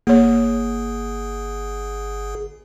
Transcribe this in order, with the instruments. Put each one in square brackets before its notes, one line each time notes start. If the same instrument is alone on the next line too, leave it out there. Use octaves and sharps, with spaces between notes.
[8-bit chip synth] G1 G#4 [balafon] A#3 C#5